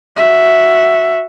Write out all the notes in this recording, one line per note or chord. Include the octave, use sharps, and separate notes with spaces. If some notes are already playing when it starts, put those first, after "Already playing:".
F#4 E5